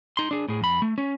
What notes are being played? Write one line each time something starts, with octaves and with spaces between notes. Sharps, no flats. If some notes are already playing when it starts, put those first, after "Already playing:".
D#4 C6
D4 G#4
A2 G#4
F2 B5
A3
C#4